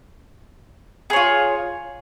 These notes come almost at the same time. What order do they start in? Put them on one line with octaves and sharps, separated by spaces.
G#4 C#5 F4